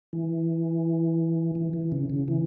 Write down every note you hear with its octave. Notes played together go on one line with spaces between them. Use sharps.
E3
E3
E3
C#3
C#3
E3